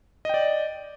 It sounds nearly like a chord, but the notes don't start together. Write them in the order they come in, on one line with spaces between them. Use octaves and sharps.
D#5 G5 D5